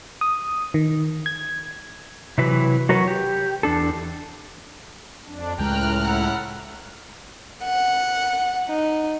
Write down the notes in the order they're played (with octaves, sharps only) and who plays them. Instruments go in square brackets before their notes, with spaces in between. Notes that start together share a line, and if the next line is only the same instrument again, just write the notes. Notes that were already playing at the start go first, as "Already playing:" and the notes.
[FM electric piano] D#6
D#3
G#6
[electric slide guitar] C3 E3 F#3 B4
F#3 F#4 A#4 B4 C#5
G4
E2 D4 A4
[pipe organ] F2 D4
[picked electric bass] C#2 G#3 [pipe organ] A2 [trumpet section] G5 [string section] A#5 F6 F#6
[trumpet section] E4 A4 F#5
[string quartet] F#5
D#4